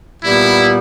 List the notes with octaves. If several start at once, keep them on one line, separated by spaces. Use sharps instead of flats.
A#2 G3 B3 E4